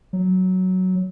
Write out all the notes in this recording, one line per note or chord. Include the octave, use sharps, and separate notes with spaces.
F#3